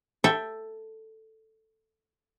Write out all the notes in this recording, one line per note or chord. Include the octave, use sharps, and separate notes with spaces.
A4 E5 G5